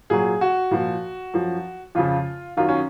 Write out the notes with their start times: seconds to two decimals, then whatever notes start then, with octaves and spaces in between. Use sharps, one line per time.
0.10 A#2 F#3 G#4
0.41 F#4
0.71 A#2 F3
1.34 F#2 F3
1.95 F2 C#3 F3 F4
2.57 F#2 D#3 F#3 F4
2.69 C#4